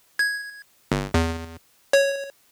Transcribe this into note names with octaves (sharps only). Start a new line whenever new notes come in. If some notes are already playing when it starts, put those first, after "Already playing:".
G#6
G1
E2
C#5